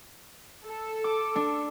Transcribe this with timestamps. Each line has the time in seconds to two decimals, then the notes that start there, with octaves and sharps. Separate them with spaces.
0.67 A4
1.04 D6
1.36 D4